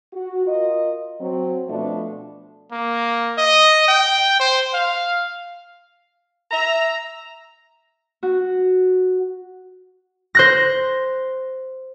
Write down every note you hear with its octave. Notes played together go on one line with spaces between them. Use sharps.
F#4
F4 A#4 D#5
F#3 C4
B2 F3 A3 B3 D4
A#3
D#5
G5
C5
F5
E5 A#5
F#4
C5 F#6 A#6